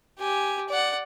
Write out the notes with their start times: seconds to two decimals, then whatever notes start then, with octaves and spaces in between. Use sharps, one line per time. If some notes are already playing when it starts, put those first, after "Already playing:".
0.20 G4 G#5
0.69 D5 F#5